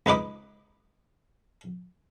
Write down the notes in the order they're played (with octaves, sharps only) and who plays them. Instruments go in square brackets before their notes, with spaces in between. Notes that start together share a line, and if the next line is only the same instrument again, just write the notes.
[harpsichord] C#2 D#4 B4 D6 D#6